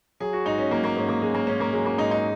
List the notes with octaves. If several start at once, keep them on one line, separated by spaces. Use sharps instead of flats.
F#3 G#4
F#4
G#2 D#4
C#4
F#3 A#3
A#3
G#2 C#4
A#3
F#3 G#3
A#3
G#2 C#4
A#3
F#3 G#3
A#3
G#2 D#4
D#4